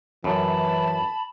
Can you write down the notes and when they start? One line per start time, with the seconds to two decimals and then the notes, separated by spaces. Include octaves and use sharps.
0.24 F#2 E3 A5 B5